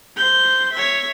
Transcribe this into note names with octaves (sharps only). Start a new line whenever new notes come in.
C5 G6
C#5 E5